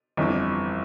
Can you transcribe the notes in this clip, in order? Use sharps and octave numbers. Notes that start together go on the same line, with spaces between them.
G1 F2 E3